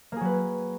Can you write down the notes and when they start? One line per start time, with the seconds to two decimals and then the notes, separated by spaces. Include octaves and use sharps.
0.12 A#3
0.16 G#4
0.21 F#3
0.25 B4